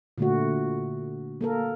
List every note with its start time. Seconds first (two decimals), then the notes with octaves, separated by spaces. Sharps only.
0.18 A#2 D3 A3 F#4
1.41 A#3 A4 A#4